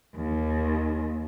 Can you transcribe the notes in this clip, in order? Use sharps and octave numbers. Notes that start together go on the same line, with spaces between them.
D#2